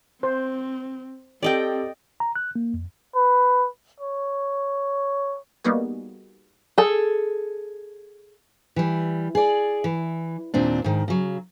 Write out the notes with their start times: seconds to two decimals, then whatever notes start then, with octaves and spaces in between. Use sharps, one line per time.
0.23 C4 C5
1.43 C4 G4 A4 D5 D#5 G5
2.20 A#5
2.36 F#6
2.56 A#3
2.74 F2
3.15 B4
4.00 C#5
5.64 G3 A#3 B3 D#4 F#4 G#4
6.78 G#4 A4
8.76 E3 G3
9.35 G#4 D5
9.84 E3
10.54 D#2 A#2 C4 D4
10.84 G#2 D#3
11.08 C#3 F#3